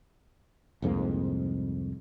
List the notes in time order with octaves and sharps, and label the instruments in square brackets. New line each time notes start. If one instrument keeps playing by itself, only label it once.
[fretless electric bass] C2 F2 G#2 A#3